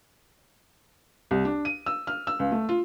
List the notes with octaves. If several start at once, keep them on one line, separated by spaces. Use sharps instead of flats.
C2
D4
D#7
E6
F6
E6
C#2
A3
F4